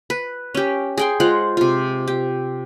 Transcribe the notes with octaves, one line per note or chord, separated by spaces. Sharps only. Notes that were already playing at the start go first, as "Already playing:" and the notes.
B4
C#4 G4
G#4 G5 C6
G#3 F4 C5 F#5
C3 F4
G4